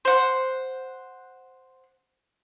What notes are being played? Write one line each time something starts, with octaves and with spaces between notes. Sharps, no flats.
C5 F#5